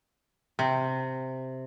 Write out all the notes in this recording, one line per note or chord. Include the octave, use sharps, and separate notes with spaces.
C3